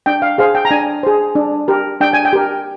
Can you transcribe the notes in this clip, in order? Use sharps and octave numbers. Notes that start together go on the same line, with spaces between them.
D4 G5
F5
G#4 C5 F5
G5
A#5
D4 G#5
G#4 C5
D4
G4 A#4
D4 G5
G#5
G5
G4 A#4